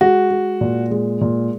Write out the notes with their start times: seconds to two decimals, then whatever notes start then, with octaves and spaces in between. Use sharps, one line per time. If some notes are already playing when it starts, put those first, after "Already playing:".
0.01 G#3 F#4
0.31 G#3
0.61 A#2
0.91 G#3
1.21 A#2